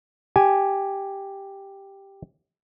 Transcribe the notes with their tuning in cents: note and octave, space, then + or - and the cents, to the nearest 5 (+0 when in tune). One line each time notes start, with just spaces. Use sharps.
G4 +0 G#5 +0